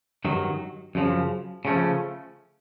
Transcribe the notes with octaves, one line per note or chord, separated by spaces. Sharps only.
G2 D#3 F#3
F#2 C#3 F3
C#3 F3 A3 C#4